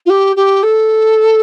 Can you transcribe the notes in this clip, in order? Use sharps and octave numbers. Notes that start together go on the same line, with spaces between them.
F4
G4
G4
A4